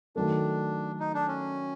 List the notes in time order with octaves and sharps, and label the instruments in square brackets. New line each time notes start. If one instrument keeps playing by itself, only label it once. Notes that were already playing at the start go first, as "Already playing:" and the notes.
[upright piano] D#3 F#3 A3 [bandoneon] D4
[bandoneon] D#4
D4
C#4